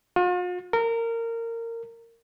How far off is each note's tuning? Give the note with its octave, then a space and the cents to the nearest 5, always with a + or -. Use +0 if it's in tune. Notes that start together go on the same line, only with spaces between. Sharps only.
F4 +45
A#4 -20